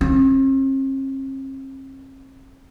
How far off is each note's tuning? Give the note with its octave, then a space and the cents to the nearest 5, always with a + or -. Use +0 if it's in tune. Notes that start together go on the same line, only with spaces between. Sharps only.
C4 +45